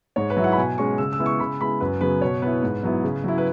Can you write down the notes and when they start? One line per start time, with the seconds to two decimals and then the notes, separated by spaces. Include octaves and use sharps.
0.16 G#2 C#5
0.30 B4
0.37 F#3 E5
0.42 E4 F#5
0.52 B5
0.57 B2 G#5
0.78 G#3 C#4 C#6
0.98 C#3 E6
1.13 E6
1.18 G#3 B3 E4
1.26 C#6
1.39 C#3 B5
1.60 G#3 B3 E4 B5
1.80 F#2 B4
2.01 C#3 F#3 B3 B4
2.21 B2 C#5
2.42 B3 E4 B4
2.63 G#2
2.83 F#3 B3 E4
3.03 C#3
3.24 F#3 E4
3.38 B4